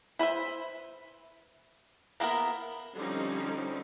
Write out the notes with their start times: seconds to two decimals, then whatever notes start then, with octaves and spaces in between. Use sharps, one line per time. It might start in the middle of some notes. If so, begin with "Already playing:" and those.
0.19 E4 B4 C5 E5
2.20 A#3 B3 E4 A#4
2.95 D3 F3 G3 C4 C#4 D#4